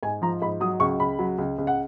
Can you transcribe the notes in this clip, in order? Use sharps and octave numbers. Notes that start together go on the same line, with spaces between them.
G#2 G#5
F3 A#5
G#2 B5
F#3 D#6
C#2 C#6
C#2 B5
F#3
C#2
C#2
F#5